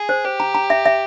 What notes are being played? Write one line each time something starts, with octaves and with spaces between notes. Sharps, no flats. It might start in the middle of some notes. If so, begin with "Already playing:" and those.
Already playing: G#4
C5
G4 C5
A#5
A#5
E5
E5